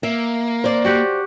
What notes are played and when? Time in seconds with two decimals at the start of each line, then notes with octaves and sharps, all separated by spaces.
0.03 A#3 E5
0.64 C5 D5
0.85 F#4 G4 F#5